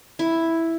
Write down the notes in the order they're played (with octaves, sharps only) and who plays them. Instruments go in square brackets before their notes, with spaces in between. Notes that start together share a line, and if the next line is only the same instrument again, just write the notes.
[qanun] E4